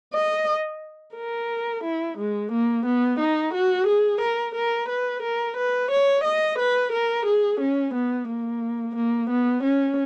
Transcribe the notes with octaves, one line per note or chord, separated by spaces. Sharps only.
D#5
A#4
E4
G#3
A#3
B3
D#4
F#4
G#4
A#4
A#4
B4
A#4
B4
C#5
D#5
B4
A#4
G#4
C#4
B3
A#3
A#3
B3
C#4